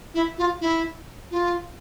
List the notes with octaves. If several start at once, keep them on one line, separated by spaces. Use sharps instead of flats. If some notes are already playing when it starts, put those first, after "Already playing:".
E4
F4
E4
F4